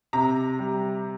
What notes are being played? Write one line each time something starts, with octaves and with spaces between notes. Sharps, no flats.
C3 A#5
G3